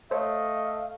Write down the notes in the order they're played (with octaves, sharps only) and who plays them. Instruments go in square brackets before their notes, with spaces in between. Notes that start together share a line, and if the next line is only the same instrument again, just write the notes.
[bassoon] A3 [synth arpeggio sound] C5 C#5 [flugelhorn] D#5 [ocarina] F5